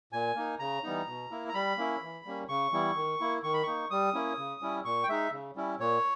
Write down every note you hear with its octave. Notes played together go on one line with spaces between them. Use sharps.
A#2 G#5
A#3 D#4
C#3 A#5
E3 G3 B3 D#4
B2
A#3 E4
A#5
G3 B5
A#3 C#4 E4
E3
G3 A#3 C#4
C#3 C#6
E3 G3 B3 E4
D#3
A#3 E4
D#3 C#6
B5
A#3 D#4 C#6
G3 D#6
A#3 C#4 E4
C#3
G3 C#4 E4
A#2 C#6
G5
G#3 D#4 E5
C#3
G3 C#4 E4
A#2 C#5